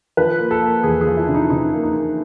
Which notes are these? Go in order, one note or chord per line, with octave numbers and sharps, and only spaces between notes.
F3 B4
A#3
A4
A#3
E2 G#4
G#4
F3
E4
C#3 D4
D#4
C#3 D#4
A#3
D#4
A#3